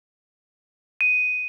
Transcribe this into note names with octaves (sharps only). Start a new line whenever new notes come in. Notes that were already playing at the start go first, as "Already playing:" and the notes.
D#7